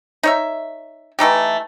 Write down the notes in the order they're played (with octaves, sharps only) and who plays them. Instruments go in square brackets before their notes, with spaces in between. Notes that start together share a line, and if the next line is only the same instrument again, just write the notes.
[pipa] D#4 C#5 E5
E3 A3 D#4 G4